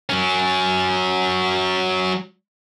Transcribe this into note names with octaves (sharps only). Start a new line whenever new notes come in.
F#3 C#4